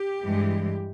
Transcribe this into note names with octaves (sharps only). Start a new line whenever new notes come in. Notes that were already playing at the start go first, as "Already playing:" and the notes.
Already playing: G4
G2 E3 G#3